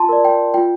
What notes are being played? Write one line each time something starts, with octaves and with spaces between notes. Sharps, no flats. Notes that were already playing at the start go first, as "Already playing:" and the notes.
Already playing: F4 A5 C6
A#4 D5
G5
F4 G5